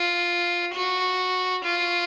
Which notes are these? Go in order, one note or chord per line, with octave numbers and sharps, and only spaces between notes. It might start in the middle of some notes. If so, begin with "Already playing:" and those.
Already playing: F4
F#4
F4